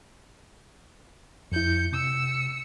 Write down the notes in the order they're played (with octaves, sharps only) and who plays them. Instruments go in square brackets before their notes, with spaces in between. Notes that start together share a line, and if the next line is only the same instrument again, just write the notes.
[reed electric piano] F2 E4 [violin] G6 C#7
[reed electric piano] C3 [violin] E6 C#7